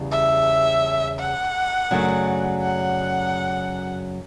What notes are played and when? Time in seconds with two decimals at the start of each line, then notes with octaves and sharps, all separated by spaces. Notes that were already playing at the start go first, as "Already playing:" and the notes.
Already playing: E2 C#3 G3
0.12 E5
1.19 F#5
1.91 F#2 C#3 F#3 A3 D4
2.62 F#5